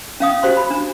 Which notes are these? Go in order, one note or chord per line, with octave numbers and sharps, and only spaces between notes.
C#4 F5 D#6
F#4 G4 C5 C6
B5
D4